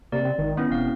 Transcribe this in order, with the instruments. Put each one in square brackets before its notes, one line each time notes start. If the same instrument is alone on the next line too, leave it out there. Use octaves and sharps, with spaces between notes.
[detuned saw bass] C3 [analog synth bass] A#3 [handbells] D5
[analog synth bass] C4
[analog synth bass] G#1 [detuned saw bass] D#3
[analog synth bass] B3 [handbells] C#4 E4
[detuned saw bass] E1 [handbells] C4 F5